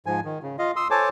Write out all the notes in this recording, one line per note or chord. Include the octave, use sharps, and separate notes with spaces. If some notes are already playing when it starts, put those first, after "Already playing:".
G#2 F3 G#5
D#3
C#3
F4 D#5 F5
C6 D#6 E6
A4 C5 C#5 G#5 A5 D6